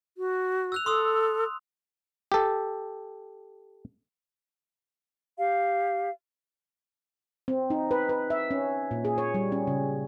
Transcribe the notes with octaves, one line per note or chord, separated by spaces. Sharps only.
F#4
E6 F#6 F7
A4 C6 D#6 E6
G4 A4
G4 F5
C4
D#4
B4
B4
E5
C#4
A#2
G#4
C#5
G3
C#4
C#3